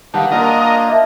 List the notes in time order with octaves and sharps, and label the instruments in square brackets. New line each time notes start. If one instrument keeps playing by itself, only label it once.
[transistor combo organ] D#3 G3 [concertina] B4 [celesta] F5 F#5 A5
[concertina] A#3 D4 F4 [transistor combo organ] A#4 D#5
[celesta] D#6
D#5 E5 A5